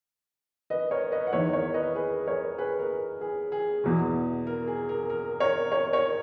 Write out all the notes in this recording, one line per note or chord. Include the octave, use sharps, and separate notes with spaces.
B4 D#5
A#4 C#5
B4 D#5
F#5
E2 D#3 C#5 E5
A#4 C#5
B4 D#5
G#4 B4
A#4 C#5
G#4 B4
A#4
G#4
G#4
E2 B2
A#4
G#4
A#4
A#4
A#4 C#5
A#4 C#5
A#4 C#5